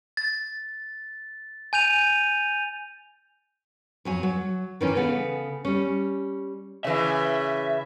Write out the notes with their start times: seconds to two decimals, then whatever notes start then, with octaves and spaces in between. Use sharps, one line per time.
0.17 A6
1.73 G#5 G6 D#7 F7
4.05 F2 F#3 G#5
4.23 F#3
4.81 D#3 E3 C#4
4.95 C#3 B3 A4
5.65 G3 C#4
6.84 C#3 E3 E5